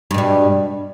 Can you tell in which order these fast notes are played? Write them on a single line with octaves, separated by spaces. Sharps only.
G2 B2 G3